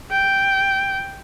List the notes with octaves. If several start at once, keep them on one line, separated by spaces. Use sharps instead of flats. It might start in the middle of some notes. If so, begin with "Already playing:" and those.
G5